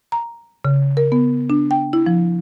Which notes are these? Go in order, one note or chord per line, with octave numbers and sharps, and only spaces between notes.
A#5
C#3
A#4
B3
D4
G5
E4
F3